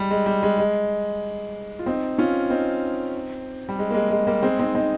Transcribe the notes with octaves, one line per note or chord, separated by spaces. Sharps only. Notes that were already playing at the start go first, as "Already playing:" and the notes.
Already playing: G3 G#3
G#3
G3
G#3
G#3
F4
C4 D#4
C#4 F4
C4 D#4
G3
G#3
A#3
G#3
G#3
G3 A#3
G#3 C4
C4 D#4
C4 D#4